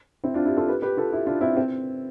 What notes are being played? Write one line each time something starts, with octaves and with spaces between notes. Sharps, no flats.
C4 E4
D4 F4
E4 G4
F4 A4
G4 B4
G4 B4
F4 A4
E4 G4
D4 F4
C4 E4
C4